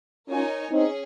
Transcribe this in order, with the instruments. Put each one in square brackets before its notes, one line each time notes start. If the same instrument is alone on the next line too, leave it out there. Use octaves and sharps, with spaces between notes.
[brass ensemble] C#4 F4 [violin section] D#4 A#4 C#5 G#5
[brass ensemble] C4 D#4 [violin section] C#4 G#4